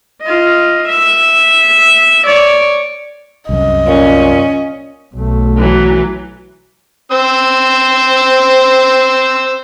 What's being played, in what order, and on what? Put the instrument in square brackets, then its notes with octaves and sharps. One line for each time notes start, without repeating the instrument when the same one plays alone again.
[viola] F4 D#5
E5
C#5 D5
[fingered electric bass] C2 F#2 [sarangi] D#5
[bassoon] A#2 [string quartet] C#4
[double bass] B1 A3
[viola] E3 F#3
[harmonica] C4 C5 E6